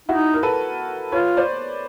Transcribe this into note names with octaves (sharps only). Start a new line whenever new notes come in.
D#4 E4 F#4
A#4
A4 B4
F4 B4 C#5
C5 D5